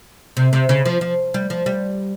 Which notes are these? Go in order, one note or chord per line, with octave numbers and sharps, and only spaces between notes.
C3
C3
C#3
F3
F3
G3
F3
G3